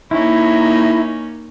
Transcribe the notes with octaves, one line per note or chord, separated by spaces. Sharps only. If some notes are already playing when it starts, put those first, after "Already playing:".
A#3 C#4 D#4 E4